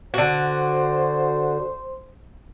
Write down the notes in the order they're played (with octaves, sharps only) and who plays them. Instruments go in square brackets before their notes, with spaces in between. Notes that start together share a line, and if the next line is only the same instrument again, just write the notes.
[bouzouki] D3 F#4 [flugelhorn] C5